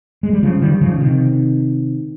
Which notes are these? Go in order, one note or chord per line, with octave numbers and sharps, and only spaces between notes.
G#3
G3
C#3 F3
D#3 G3
C#3 F3
C3 D#3